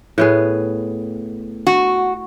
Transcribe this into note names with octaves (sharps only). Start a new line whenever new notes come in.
A2 B3 G#4
F#4